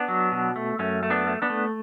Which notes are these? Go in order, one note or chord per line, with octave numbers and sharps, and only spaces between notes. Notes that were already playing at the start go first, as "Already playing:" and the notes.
Already playing: B3 D4
F#3
B2
A3
F#2 A3 C#4
A3
B3 D4
A3
B3 D4
A3